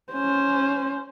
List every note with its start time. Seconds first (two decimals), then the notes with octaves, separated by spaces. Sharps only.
0.13 C#4 C5